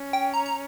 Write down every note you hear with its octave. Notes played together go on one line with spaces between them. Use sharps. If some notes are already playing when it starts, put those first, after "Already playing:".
Already playing: C#4
G5
A#5
A#5